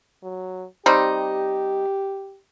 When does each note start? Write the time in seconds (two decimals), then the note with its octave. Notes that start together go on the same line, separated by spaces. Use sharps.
0.23 F#3
0.86 G3 C4 D#4 G4